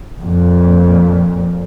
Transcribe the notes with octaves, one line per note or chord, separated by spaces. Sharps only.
F2 A#2